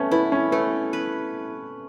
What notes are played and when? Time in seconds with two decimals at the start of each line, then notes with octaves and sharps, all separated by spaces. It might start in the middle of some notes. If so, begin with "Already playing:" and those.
Already playing: A3 B3 C#4
0.11 B3 E4
0.32 C#4
0.52 A3 B3
0.93 B4